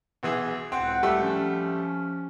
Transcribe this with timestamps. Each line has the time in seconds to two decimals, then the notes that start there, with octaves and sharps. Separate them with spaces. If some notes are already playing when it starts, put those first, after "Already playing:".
0.23 B1 E3 G#4
0.72 C#2 A2 C4 F#5
1.03 G3 A3 E6
1.21 F3 C#4